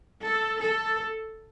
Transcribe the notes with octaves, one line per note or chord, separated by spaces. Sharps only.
A4
A4